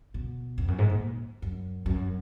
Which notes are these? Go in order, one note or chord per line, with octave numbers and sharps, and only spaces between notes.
B2
F2
F#2
G#2
A#2
F#2
F#2